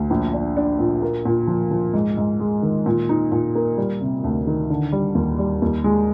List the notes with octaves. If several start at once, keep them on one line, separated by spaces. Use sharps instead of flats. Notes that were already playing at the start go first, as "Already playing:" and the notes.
Already playing: D2
A#1
D4
D4
A#2
A#3
A#2
F3
F3
G#2
G#2
G#3
D#3
A#2
D#4
A#2
A#3
G3
C3
D2
D#3
D3
G3
D#2
G3
D#2
G#3